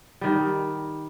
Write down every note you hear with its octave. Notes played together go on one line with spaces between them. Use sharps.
D#3 G3